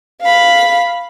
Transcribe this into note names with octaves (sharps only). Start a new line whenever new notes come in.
F5 B5